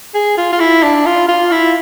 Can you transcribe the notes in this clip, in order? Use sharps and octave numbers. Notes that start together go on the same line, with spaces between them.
G#4
F4
F4
E4
D4
F4
F4
E4